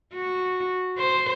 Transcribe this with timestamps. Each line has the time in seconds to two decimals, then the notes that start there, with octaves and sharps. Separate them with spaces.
0.15 F#4
0.98 C5